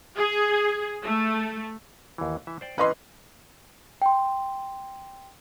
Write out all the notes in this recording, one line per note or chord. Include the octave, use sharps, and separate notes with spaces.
G#4
A3
D#2 E3
E3 E5
C5 D5 G5
E3 C4 C#4 B4 D#5 C6
G5 C6